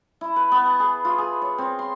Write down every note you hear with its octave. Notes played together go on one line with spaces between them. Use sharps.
E4
B4
B3
A5
G#4
F4
G#4
C#5
C4
C6